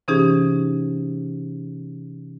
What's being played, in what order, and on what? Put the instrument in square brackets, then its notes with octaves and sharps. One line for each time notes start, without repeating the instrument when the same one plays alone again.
[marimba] C3 E3 C#4 D#4 G4 G#4